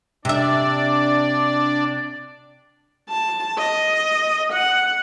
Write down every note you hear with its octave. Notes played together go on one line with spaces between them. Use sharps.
C3 D4 D5 E5
A5
D#5
F#5